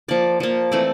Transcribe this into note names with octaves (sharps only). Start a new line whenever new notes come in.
F3 A#3 D5
F3 A#3
E3 A3 C4 D5